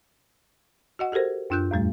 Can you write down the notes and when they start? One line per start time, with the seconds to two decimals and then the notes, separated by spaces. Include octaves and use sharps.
0.99 F#4 D#5 F#5
1.12 F#4 G4 A4 A#4 C5
1.50 F#2 D4 F4 F#6 G6
1.71 E2 A2 G3 A3